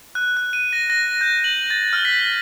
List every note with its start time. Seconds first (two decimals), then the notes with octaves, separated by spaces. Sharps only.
0.15 F#6
0.37 F#6
0.53 D#7
0.73 A#6
0.90 A#6
1.21 G6
1.44 F#7
1.70 A6
1.93 F6
2.05 B6